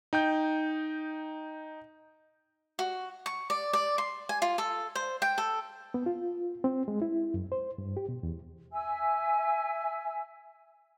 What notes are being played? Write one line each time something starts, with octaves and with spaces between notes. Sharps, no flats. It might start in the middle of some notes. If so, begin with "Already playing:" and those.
D#4 G5 G6
F#4
C#6
D5
D5
C6
G#5
F4
A4
C5
G5
A4
B3
F4
C4
G#3
E4
F#2
C5
G2
G4
B2
E2
E5 G#5 E6